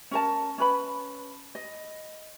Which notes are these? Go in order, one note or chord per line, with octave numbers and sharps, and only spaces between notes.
C#4 A#4 A5
C#4 B4 B5
D#5